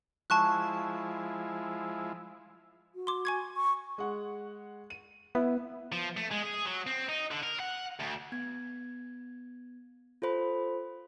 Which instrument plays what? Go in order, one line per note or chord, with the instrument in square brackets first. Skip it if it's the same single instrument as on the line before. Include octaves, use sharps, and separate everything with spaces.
[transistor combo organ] F3 G#3 E4 [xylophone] A5 C#6 F#6
[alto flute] F#4
[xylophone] C6 D6
G#5 C#6 G#6
[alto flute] C#6
[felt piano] G#3 F#5
D#7
[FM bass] B3 [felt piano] E4
[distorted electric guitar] F3
A3
G#3
G#4
F#3
C4
D#4
D3
A#4
F#5
D2
[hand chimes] B3 G#6
F4 A4 C5 B5